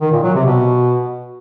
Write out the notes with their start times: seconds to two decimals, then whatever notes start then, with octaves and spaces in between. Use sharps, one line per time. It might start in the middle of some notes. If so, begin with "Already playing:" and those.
0.01 D#3
0.12 A#2
0.23 F#3
0.34 C3
0.45 B2